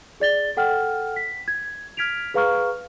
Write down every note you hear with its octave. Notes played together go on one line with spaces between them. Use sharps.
G#4 D5 A6 G7
A4 F#5 G5 F6
B6
G#6
F6 G#6 B6 D7 F7
G#4 B4 F5 A#5 C#6 F6